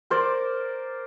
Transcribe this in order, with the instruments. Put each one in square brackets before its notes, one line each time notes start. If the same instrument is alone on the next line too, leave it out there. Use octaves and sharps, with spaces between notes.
[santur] A#4 C5 D5